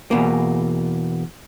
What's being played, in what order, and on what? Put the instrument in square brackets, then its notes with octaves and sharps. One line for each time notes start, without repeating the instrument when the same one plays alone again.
[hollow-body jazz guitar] E2 B2 A#3